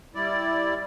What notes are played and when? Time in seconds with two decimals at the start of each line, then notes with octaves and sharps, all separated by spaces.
0.15 G3 E4 D5